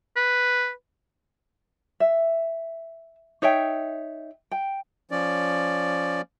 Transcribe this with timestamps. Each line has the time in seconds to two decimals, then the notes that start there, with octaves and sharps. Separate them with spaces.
0.16 B4
2.00 E5
3.42 D#4 C#5 E5 G5
4.51 G5
5.11 F3 C#4 D5